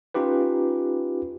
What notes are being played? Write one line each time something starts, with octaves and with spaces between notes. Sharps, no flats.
C#4 D#4 F4 G4 B4